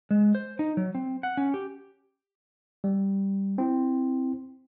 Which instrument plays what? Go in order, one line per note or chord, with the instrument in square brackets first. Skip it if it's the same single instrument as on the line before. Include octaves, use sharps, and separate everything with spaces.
[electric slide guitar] G#3
C5
D#4
F#3
C4
F#5
C#4
G4
[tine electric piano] G3
C4 E4